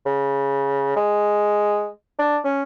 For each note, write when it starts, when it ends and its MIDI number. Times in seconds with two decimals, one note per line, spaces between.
0.06 0.93 49
0.96 1.88 56
2.19 2.37 62
2.44 2.63 61